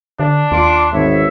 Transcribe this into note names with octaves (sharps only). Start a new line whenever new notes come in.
D3 D4
D#2 F4 C6 D6
G#1 B3 C#5 E5